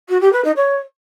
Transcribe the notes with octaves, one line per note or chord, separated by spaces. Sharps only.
F#4
G4
B4
D#4
C#5